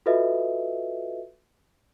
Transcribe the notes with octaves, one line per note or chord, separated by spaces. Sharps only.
F4 F#4 A4 B4 D#5 E5